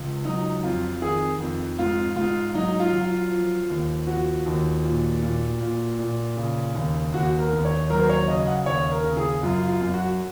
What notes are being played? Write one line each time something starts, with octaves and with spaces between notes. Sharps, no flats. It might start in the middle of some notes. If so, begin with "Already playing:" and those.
Already playing: C#2
F#3 D#4
F2 F4
D#3 G#4
F2
G#2 F4
G#2 F4
F#3 D#4
F4
F#3
F4
F3
D#2
F3 F#4
D#2
A#2
A#2
A#2
A#2
C#3
D#2
D#2 F#4
A#4
D#2
C#5
F#3 A#4
C5
C#5
C#3 D#5
F#5
D#2 C#5
A#4
C#3
G#4
F#2 F4
F4
F#2
F#4